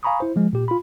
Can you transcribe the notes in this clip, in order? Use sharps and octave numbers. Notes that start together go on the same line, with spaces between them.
F5 G#5 A#5 B5 C#6 D#6
E4 C5
F3 G#3
A#2 G4
F4 B5